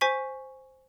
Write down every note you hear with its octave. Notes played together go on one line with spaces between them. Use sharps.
C5 G#5 C#6 B6